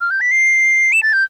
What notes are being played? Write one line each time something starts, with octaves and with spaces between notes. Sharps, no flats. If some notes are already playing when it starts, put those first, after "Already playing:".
F6
G6
B6
C7
E7
A6
G6